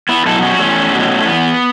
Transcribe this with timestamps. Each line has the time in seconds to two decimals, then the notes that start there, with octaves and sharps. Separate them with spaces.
0.09 B3 E4
0.26 B2 F#3 E4 A4
0.42 C#4 F#4
0.59 E2 A3 C#4
0.92 B2 F#3
1.26 E2 B3